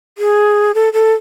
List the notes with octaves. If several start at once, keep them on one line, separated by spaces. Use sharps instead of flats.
G#4
A4
A4